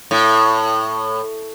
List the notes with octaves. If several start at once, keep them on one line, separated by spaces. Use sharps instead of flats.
A2